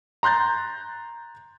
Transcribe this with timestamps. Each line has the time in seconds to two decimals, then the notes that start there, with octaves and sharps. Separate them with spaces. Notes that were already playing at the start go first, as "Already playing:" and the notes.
0.23 A#5 C6 F#6 G6 A6